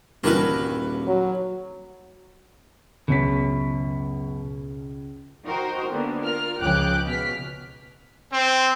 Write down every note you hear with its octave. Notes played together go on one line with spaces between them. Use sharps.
D#1 G2 D3 E3 F#4 A#4 B4
F#3
C#2 F#2 B2 C#4 B6
D#4 F#4 A#4 C5 G5
D3 A#3 B3
F4 A#4 F6
C#2 C#3 F3 G5 D6 F#6
B2 F6 B6
C4